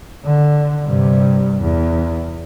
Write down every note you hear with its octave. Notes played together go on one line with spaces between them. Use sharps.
D3
G2 C3
E2